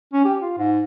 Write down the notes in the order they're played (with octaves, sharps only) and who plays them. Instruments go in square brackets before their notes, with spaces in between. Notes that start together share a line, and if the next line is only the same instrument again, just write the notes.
[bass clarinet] C#4
G4
F4
G#2